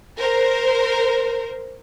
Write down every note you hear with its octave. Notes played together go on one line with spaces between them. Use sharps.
A#4 C5